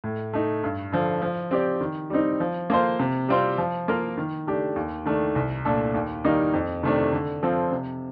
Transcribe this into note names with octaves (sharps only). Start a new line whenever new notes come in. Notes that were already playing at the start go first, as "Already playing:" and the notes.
A2
A3 D#4
G2
D3 F3
F3
C4 G4 D5
D#3
G3 C4 D#4
F3
A#3 F4 A4 C5
C3
G3 C4 F4 C5
F3
A#3 F4 A#4
D#3
A3 D4 G4
D#2
D#3 A3 D4
C2
A#2 A3 D4 A4
D#2
D#3 G3 A#3 D#4
F2
C3 D#3 A3 D4
D3
F3 C4 F4 A4
C3